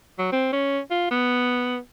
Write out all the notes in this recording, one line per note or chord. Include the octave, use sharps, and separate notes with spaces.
F#3
C4
C#4
F4
B3